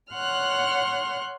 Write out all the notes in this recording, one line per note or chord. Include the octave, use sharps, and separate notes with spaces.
C#5 F#5 C6 F6 F#6